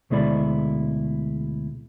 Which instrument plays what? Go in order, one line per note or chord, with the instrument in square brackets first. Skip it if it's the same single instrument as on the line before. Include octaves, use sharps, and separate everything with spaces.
[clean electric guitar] D2 B2 G#3 E4 D5 B5